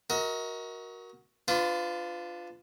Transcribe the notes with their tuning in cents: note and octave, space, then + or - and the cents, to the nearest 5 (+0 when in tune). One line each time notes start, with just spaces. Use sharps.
F#4 +0 A#4 +10 D#5 +40
D4 +10 F4 +0 B4 +40